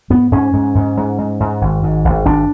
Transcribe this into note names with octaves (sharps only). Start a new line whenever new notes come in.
G#2 B3
G#2 C#4
G#2
G#2
G#2
G#2
G#2
G#1
G#2
G#1
G#1 D4